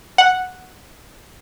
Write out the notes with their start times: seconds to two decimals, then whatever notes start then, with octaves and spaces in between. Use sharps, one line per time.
0.18 F#5